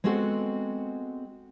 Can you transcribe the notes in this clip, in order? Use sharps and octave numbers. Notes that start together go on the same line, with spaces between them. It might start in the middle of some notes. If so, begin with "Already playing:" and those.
G#3 B3 C4 F#4 A4